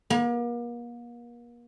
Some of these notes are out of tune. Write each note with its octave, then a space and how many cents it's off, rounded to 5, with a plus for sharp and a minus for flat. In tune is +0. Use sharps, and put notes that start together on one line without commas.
A#3 +40